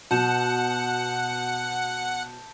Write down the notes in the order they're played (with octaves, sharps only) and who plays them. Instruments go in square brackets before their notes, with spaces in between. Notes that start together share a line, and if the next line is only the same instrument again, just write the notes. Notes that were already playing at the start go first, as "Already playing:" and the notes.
[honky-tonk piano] B2 [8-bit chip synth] F#5 [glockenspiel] A5 G6 E7